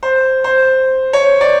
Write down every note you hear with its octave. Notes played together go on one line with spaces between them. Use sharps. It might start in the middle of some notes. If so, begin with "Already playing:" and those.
C5
C5
C#5
D5